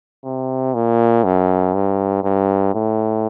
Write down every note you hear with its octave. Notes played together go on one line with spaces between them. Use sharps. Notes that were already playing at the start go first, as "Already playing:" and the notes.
C3
A#2
F#2
G2
G2
A2